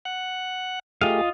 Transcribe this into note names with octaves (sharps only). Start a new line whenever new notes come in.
F#5 F#6
A3 F4 G4 G#4 D#5 F5